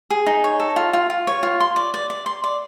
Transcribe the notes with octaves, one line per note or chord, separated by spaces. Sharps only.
G#4
D#4
C#5
A4
F4
F4
F4
C#5
F4
C6
D5
D5
D5
C6
D5